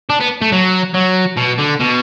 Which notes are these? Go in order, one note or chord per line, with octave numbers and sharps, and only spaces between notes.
D4
B3
A3
F#3
F#3
B2
D3
B2